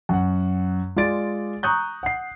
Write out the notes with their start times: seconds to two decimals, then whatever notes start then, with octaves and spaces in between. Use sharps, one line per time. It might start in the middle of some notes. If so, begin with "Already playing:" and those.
0.09 F#2 F#5
0.96 G#3 F4 G#4 D5 A6 D7
1.63 A#5 C#6 D#6 F#6 G6
2.03 F#5 C7